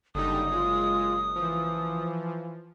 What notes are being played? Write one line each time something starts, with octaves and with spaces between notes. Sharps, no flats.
F#1 D3 G3 D#4 D#6
G#3 F4
E3 F3